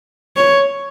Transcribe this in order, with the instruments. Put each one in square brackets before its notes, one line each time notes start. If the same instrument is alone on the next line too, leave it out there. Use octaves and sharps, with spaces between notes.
[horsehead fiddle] C#5